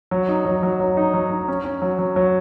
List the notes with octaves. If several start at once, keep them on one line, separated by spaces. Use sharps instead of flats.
F#3
D#4
F#3
F#3
F#3
D#4
F#3
D#4
C#4
C#4
F#3
F#3
F#3